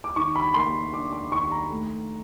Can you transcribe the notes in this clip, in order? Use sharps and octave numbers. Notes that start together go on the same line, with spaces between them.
D6
D#3 C#6
B5
A#3 C6
D4 D6
D6
D#3 C#6
A#5
A3